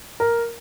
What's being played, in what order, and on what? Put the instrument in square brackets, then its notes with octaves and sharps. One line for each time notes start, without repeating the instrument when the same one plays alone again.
[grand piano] A#4